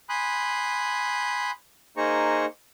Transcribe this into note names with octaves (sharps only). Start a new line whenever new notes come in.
G#5 B5 C6 D#6 F#6 G6
A#3 D#4 G#4 C5 A#5 C#6